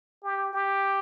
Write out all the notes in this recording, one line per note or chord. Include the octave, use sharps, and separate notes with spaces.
G4
G4